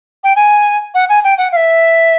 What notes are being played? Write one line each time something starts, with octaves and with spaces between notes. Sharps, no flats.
G5
G#5
F#5
G#5
G5
F#5
F5
E5